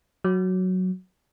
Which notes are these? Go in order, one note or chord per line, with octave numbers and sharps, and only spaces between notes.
F#3